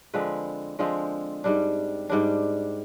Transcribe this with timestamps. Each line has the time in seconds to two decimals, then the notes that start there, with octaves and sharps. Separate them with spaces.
0.14 D3 F3 G#3 C4 B4
0.79 D3 F3 G#3 C4
1.44 G#2 G3 D4
2.09 G#2 G3 D4